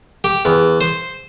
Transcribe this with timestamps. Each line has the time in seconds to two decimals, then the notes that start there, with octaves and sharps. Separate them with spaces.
0.24 G4
0.45 E2
0.81 C5